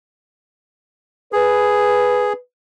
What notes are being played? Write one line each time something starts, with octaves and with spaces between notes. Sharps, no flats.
G#4 B4